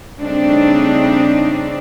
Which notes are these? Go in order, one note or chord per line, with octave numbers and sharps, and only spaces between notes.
C#3 G3 A3 C4 D4 D#4